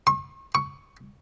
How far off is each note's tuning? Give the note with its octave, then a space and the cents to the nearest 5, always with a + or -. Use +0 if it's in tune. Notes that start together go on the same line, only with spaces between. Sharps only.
C#6 -40
C#6 +10